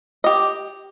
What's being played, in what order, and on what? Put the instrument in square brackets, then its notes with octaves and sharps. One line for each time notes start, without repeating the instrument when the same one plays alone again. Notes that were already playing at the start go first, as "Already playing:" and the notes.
[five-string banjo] G4 D#5